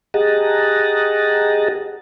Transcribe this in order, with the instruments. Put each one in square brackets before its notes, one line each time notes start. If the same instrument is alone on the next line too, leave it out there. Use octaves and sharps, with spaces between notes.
[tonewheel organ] G4 G#4 D#5 F#5 A5 A#5